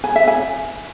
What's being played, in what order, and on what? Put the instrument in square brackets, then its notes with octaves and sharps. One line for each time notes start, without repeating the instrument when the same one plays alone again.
[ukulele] G#5
E5
G#5